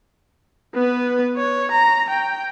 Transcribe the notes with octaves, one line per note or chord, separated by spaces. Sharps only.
B3 B4
C#5
A#5
G5